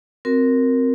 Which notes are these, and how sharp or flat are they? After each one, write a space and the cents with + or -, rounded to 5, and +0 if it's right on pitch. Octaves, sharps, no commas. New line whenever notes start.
C4 +0 F#4 +0 A#4 +0